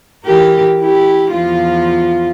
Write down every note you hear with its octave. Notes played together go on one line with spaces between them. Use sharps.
E3 G4 A#4
E4 G4
E2 F3 F4